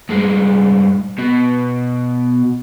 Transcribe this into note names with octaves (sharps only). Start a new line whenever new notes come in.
G2 G#3
B2